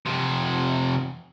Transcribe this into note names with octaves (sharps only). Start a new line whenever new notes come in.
F2 C3